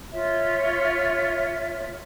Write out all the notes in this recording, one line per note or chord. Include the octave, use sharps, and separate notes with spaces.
F4 C#5 E5